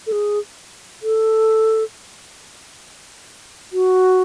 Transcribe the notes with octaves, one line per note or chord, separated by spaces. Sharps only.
A4
G#4
A4
F#4